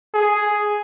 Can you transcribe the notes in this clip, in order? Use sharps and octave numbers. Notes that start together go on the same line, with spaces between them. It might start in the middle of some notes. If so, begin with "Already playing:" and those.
G#4